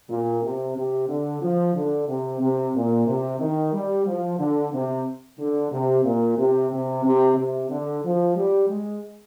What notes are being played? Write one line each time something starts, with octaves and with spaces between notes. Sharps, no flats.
A#2
C3
C3
D3
F3
D3
C3
C3
A#2
C3
D#3
G3
F3
D3
C3
D3
C3
A#2
C3
C3
C3
C3
D3
F3
G3
G#3